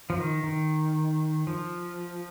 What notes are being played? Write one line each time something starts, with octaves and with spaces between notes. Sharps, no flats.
F3
D#3
D#3
F3